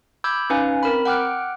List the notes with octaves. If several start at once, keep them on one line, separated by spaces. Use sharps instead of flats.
B5 D6 E6 G6 G#6
C#4 D#4 B4 F5 G#5
C4 A#4 B5
F#5 G5 D6 F6 F#6